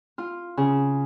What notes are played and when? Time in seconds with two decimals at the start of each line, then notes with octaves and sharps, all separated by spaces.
0.18 F4
0.57 C#3